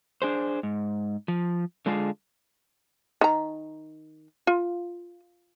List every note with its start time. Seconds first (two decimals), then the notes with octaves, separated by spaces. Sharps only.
0.22 D4 G#4 C5
0.63 G#2
1.28 F3
1.86 D3 G#3 D4 F4 G#4
3.21 D#3 A#5
4.47 F4